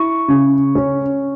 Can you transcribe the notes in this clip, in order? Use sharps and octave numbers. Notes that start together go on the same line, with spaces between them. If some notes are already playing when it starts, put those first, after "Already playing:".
Already playing: E4 C#6
C#3
C#4